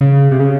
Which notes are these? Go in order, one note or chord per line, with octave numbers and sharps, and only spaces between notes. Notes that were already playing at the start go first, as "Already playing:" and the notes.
C#3
C3
C#3